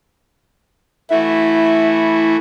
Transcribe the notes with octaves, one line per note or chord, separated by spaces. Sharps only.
E3 A3 E4 F#4 E5